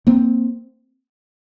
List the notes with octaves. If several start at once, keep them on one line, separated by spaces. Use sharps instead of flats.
A#3 C4